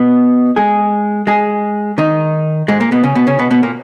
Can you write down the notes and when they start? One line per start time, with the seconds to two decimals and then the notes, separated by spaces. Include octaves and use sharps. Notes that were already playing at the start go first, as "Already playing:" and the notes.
Already playing: B2 B3
0.56 G#3 G#4
1.27 G#3 G#4
1.98 D#3 D#4
2.68 G#2 G#3
2.80 A#2 A#3
2.92 B2 B3
3.03 C#3 C#4
3.15 B2 B3
3.27 C#3 C#4
3.39 B2 B3
3.51 B2 B3
3.63 A#2 A#3